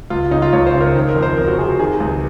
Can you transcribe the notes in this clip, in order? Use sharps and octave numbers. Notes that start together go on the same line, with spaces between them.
C#2 F4
C#3 D#4
F4
C#2 C#5
C5
C#3
A#4
D#3
A#4
F2
C5
F2 A#4
F#4
C3 G#4
F#4
D#3 G#4
C#2